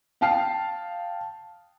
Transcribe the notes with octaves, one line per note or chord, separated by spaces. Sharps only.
F5 G5 A5 F6 C7